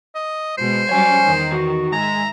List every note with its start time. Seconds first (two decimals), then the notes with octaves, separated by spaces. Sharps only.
0.15 D#5
0.58 B2 G#3 C5
0.89 F#3 G3 C#4 C#5 G#5
1.23 E2 D#3
1.52 F#4
1.92 G#2 G#3 E5 A#5